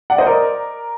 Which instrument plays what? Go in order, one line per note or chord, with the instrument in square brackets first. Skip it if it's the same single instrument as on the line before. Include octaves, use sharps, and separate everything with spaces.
[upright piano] D5 F#5
C5 D#5
A#4 D5